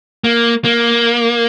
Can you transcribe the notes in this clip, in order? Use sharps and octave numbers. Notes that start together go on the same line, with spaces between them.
A#3
A#3